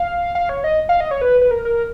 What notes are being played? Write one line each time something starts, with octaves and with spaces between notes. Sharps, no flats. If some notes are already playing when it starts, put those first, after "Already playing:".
Already playing: F5
F5
C#5
D#5
F5
D#5
C#5
B4
B4
A#4
A#4